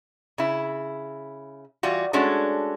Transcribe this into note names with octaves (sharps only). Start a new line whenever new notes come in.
C#3 E4
E3 G3 F4 F#4
G#3 A3 C#4 D4 F#4